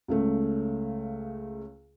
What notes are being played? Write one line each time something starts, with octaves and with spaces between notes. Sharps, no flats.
C#2 C#3 A3